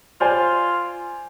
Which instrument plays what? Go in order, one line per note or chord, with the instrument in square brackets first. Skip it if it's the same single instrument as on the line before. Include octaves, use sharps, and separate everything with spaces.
[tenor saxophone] F4 [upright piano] C5 D5 G#5